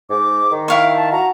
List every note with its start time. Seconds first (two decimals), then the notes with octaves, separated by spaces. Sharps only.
0.10 G#2 D6
0.52 D#3
0.68 E4 F5 G5 C#6
0.95 A5
1.12 F#4 A#5